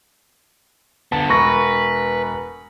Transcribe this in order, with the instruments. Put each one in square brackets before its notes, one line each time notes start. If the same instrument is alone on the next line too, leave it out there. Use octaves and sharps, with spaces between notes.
[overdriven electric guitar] D3 B3 [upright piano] A5
[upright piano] E1 C#6 A#6 [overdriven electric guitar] B4